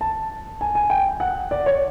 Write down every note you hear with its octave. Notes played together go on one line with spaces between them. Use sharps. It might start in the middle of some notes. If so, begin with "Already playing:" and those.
A5
G#5
G#5
G5
F#5
D5
C#5